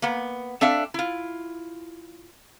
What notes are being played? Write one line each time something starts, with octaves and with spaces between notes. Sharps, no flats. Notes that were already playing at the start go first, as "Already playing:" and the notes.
A#3 B3
C4 D4 A4 E5 F5
E4 F4